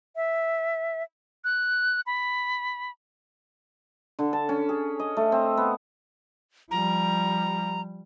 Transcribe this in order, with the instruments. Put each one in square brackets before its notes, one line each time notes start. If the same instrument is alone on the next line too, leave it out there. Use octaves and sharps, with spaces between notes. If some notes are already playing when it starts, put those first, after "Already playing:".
[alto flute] E5
[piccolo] F#6
B5
[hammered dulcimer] D3
A5
C#4
G#4
D#5
A3
C4
B3
[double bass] F3 G3 [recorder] A#5